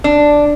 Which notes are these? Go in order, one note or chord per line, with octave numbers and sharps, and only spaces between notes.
D4